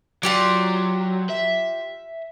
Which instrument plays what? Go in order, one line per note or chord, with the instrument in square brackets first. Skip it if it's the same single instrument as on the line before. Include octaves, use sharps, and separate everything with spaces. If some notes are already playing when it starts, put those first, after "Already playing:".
[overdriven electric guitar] F#3 [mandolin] F4 G4 D5
[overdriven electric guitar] E5